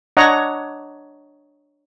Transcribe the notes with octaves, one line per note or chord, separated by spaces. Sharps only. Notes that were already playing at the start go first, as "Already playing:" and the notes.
D4 C#5 D#5 F#5 A#5